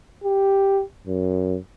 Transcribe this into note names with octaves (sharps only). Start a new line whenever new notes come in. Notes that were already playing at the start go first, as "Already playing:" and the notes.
G4
F#2